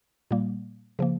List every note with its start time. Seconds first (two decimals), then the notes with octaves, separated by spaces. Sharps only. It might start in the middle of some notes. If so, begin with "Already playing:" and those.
0.31 A#2 G3 A#3
0.99 C#3 F3 A#3